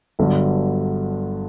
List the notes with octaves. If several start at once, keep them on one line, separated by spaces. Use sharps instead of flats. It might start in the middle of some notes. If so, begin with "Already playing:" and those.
G1 G2 D3 F#3